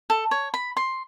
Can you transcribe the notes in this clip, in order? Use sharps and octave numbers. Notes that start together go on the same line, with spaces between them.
A4
C#5
B5
C6